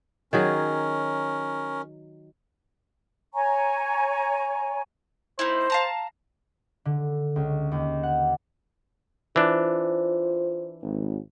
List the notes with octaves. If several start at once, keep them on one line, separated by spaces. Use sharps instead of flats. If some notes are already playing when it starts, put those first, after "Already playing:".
D#3 F#3 C#4 G#4 A#4
C#5 G#5 A#5 C#6
A#3 D#4 E4 C5
F5 A5 A#5
D3
C#2
D#2
F#5
E3 D4 F4 C5
G#1